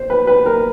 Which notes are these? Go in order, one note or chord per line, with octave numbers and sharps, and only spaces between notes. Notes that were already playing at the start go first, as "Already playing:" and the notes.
Already playing: C5
B4
B4
A#4